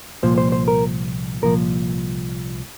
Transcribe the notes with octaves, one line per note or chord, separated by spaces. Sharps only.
C2 A#2 F3 C5
C5
C5
A#4
C2 A#2 F3 A#4